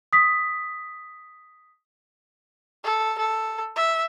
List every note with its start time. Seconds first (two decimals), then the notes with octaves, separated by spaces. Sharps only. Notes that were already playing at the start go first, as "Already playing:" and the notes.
0.13 D#6 B6
2.84 A4
3.18 A4
3.76 E5